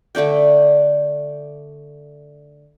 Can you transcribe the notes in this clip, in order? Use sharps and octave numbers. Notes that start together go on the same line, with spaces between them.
D3 A3 D4 G5